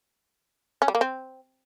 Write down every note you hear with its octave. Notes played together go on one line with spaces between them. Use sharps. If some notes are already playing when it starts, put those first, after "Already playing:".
C#4
G3
A#3
C4